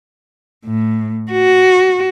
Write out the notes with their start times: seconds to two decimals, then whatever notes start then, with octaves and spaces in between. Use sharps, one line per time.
0.66 A2
1.32 F#4